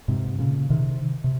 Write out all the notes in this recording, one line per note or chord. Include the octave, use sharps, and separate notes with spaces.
G#2 C3
A#2 C#3
C3 D#3
C3